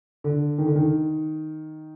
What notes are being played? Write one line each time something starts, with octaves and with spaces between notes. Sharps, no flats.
D3
D#3
D3
D#3